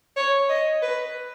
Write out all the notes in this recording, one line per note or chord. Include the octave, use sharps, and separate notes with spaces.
C#5
D#5
B4